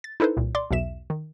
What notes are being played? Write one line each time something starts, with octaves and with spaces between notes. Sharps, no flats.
A6
D#4 E4 A4 B4 C5
C2 A#2
D5 C6 D6
B1 E2 B2 E5 E7
D#3